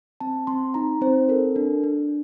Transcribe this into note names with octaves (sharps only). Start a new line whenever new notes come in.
C4 A5
C4 C6
D#4 A#5
C4 C5
A4 A#4
D4
D4